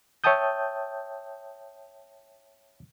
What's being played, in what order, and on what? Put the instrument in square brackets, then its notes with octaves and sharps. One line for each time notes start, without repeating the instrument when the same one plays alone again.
[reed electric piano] C#5 E5 G5 A5 D#6 G6